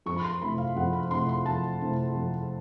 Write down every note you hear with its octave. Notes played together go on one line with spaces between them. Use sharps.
F2 C#6
B5
C6
C3 E3 A3 B5
F5
F2 F#5
B5
C3 E3 A3 C6
C6
F2 A5
C3 E3 A3
F2